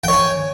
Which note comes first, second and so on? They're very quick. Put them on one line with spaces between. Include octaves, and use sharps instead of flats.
G5 C#5 G#5